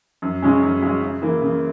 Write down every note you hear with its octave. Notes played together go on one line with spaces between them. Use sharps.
F#2
C#3 G#3 C#4
F#2
C#3 G#3 C#4
C#3
E3 A#3
C#3